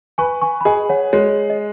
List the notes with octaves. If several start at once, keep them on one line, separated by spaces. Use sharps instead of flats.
B4 G#5 C#6
G#5 C#6
B5
G#4 D#5 G#5
C#5 F#5
G#3 C#5
D#5